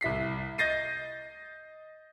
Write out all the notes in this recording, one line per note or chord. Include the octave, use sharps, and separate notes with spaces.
C2 E4 B6 C7
D#5 G6 A6 A#6 C7 D#7